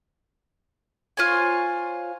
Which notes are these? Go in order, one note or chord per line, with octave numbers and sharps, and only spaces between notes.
F4 C5 C#5 G#5